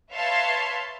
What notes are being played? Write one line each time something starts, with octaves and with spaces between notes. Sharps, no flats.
B4 C#5 E5 F5 A5 C6